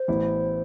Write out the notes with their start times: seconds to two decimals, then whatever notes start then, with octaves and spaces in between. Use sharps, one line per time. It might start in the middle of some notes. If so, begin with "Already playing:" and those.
Already playing: C5
0.08 A1 A2 E3 B3 E4